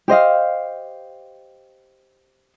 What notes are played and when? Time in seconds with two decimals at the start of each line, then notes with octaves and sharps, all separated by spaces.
0.08 G4 C5 D#5 F5